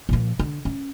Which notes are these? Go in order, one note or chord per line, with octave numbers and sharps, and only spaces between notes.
A#2 F3
D3
C#4